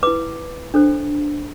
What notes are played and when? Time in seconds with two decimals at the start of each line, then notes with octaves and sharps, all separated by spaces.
0.03 E4 B4 D6
0.74 D4 A4 C5